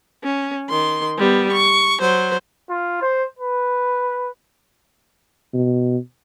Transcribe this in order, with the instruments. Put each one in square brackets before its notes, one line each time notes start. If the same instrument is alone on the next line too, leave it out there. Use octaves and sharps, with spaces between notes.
[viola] C#4
D#3 C6
G3 B3
C#6
F#3 C5
[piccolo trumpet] F4
C5
B4
[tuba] B2